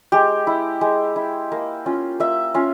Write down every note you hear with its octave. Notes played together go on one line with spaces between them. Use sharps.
G#3 G4
E4
G#3
E4
A#3
C#4 F4
A#3 E5
C#4 F4